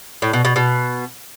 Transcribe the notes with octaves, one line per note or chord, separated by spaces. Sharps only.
A2
B2
B2
B2